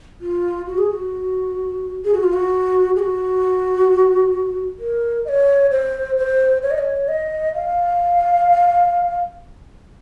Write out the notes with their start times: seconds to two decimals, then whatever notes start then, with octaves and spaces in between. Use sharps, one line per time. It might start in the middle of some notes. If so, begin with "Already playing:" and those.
0.21 F4
0.66 F#4
0.78 G#4
0.90 F#4
2.05 G#4
2.14 F#4
2.23 F4
2.33 F#4
2.96 G#4
2.99 F#4
4.79 A#4
5.25 D#5
5.29 C#5
5.71 C5
6.17 C5
6.62 C#5
6.71 D#5
6.78 C#5
7.08 D#5
7.55 F5